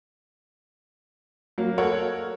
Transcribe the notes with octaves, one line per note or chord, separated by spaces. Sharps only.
F#3 A#3
A4 A#4 C#5 F#5